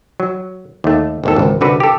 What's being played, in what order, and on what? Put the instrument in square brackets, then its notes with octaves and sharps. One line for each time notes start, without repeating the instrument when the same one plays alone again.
[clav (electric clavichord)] F#3
D#2 A3
G#1 D#2 A4
G#1 C#2
C2 D3 F#4 B4
G4 A4